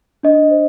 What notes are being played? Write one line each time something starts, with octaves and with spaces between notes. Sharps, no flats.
D4 D#5
C5